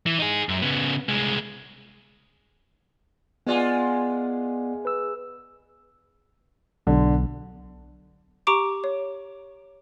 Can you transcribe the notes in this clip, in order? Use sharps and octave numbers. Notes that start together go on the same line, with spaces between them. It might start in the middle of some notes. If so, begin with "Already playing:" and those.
E3
D#4 G#4
F#2
C#3 B3
C2 G#3
G#3 B3 F4 G#4 D5 F#5
B4 E6
B1 D3
G4 A#5 C#6 D6 D7
C#5